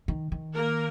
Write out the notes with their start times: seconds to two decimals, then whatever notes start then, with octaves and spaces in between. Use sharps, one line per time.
0.08 D#3
0.32 D#3
0.54 A#3 A#4